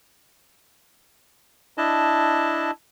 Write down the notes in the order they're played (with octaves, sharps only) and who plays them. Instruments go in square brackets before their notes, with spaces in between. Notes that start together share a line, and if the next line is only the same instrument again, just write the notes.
[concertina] D4 E4 D#5 A5